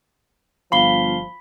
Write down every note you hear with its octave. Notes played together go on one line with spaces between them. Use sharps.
G1 F3 F5 B5 C7 G7